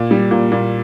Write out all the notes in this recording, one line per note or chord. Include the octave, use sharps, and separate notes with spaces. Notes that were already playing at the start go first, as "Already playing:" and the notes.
Already playing: A#2
G3
A#2
A#2